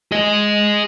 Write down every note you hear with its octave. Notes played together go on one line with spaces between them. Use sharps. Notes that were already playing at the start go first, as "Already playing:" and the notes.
G#4 D#5